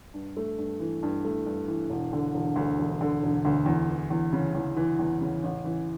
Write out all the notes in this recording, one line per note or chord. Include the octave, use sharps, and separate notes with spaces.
G2
A3
G2
E3
G2
A3
G2
E3
E1
D3
E1
D2
E1
D3
E1
D2
E2
E3
E2
C#3
E2
E3
E2
C#3
A1
E3